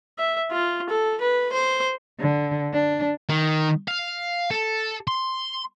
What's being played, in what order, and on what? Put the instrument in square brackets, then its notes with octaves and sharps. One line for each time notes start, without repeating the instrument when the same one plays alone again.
[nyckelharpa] E5
F4
A4
B4
C5
[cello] D3
D4
[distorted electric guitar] D#3
F5
A4
C6